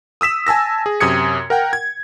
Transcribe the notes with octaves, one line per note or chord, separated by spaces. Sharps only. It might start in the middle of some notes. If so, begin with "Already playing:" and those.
D#6 E6 B6 E7
G#5 A5 E6 A#6
G#4
F#2 C3 D#6 G#6 C#7
A#4 F#5 G5
G#6